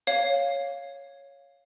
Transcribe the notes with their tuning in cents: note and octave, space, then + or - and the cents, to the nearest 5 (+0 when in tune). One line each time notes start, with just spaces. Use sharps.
C#5 +0 F5 +0